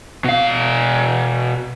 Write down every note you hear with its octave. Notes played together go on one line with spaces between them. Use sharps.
B2 F5